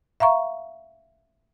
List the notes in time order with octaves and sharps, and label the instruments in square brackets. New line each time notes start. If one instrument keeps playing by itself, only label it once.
[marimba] E5 F5 A#5 C#6